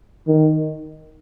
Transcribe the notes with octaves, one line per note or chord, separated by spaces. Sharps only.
D#3